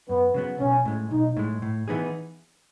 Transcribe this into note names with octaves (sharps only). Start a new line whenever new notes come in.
F#2 B3
C#3 F#3 B3
B1 C#4
A2 G#3
B1 D#4
A2 G#3
A2
E3 B3 D#4 G#4